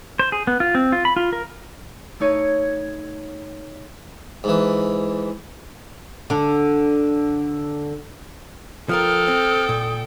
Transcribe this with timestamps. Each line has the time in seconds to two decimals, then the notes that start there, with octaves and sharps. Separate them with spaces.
0.19 C5
0.32 G#4
0.47 B3
0.60 F4
0.75 C4
0.92 F4
1.05 B5
1.17 F4
1.33 A#4
2.20 A3 D#4 C#5 G#6 D#7
4.44 G#2 E3
6.30 D3 D4
8.89 F3 F4 A4 A#4 G5 D#6 F6
9.28 C4
9.69 A#2